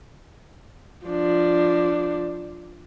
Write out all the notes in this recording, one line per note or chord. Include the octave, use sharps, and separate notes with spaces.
F3 D4